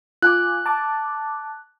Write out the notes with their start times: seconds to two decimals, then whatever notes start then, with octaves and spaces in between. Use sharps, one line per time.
0.22 F4 G#5 D6 F#6
0.66 A5 D6